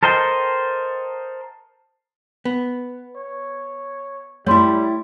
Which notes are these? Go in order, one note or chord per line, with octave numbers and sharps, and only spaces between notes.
A4 A#4 C5 D#5 G5
B3
C#5
G3 A3 E4 C#5 C6